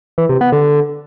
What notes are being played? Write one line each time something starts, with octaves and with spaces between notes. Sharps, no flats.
E3
C3
B3
D3